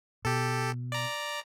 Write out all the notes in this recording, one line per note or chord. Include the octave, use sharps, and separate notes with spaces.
B2 G4 A4
D5 A#5